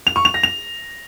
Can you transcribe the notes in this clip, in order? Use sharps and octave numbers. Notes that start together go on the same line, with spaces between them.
F7
C#6
F7
A#6
F7